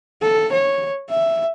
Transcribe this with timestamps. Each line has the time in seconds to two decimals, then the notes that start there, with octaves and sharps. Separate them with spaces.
0.21 A4
0.52 C#5
1.09 E5